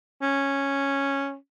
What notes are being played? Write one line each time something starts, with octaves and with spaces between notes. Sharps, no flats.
C#4